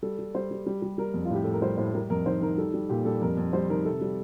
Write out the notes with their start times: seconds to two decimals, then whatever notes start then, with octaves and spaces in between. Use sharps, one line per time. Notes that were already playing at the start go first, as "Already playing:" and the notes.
0.03 G3 A4
0.19 G3
0.35 G3 C5
0.51 G3
0.66 G3
0.82 G3
0.98 G3 A#4
1.14 F2
1.25 F4
1.30 A2 G4
1.44 A2 A4
1.53 A#4
1.62 G3 C5
1.77 A2 C5
1.94 G3 A#4
2.10 F2 A#4
2.26 D#3 C5
2.42 D#3 A#4
2.58 G3 A4
2.74 G3
2.89 A#2 G4
3.05 G3 A4
3.21 F2 A#4
3.37 F2
3.53 G3 C5
3.70 D#3 A#4
3.85 C3 A4
4.01 G3